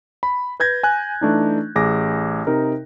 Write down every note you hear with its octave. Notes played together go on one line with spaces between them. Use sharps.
B5
B4 G6 G#6 A#6
G#5 F#6
E3 A3 D4 D#4
A1 G#4 D6 A#6
C3 D#4 A#4